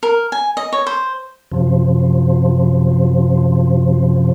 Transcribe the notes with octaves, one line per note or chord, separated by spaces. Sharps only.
A#4
G#5
D#5
C#5
C5
F#2 C3 F3